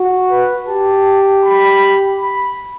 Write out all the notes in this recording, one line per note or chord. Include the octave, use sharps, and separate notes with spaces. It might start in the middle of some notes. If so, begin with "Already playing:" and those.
Already playing: F#4
B4
G4 A5
B5
B5